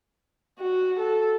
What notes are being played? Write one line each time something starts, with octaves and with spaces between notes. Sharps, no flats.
F#4
A4